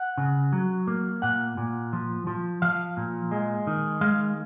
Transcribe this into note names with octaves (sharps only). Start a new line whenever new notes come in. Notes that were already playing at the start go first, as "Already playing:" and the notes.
Already playing: F#5
C#3
F#3
A#3
A#2 F#5
A#2
F3
F3
F3 F5
A#2
G#3
D#3
G#3 F5